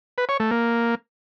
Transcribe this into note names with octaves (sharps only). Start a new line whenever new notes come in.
B4
C#5
A3
A#3